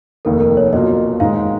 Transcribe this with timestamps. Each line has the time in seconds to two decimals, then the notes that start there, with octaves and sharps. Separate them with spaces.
0.25 F1 D#2 D#3 A#4
0.41 A#4
0.57 C#5
0.73 B1 B2 F#3 A#3 F4 D#5
1.20 G#2 D#3 G#3 F5